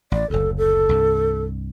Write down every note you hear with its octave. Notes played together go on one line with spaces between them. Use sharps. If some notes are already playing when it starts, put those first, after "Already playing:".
A1 D5
F#1 D2 A4
A4
C2 G2